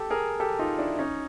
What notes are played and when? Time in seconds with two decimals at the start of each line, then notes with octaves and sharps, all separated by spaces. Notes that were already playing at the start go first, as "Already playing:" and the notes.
Already playing: G4 A4
0.10 G#4 A#4
0.40 G4 A4
0.59 D#4 F4
0.79 D4 E4
0.99 C#4 D#4